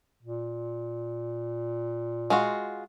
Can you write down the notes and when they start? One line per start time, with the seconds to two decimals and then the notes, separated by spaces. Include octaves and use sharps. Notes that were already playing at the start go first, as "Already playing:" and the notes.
0.23 A#2
2.30 G#3 F4 F#4